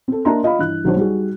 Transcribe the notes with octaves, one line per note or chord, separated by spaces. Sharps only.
C4 A4
A#3 D4 D#5 E5 A#5 C6
F4 D#5 F5 B5
G2 E3 F#6
B1 F#3 D4 C5
G3 D#4 F#4 G#4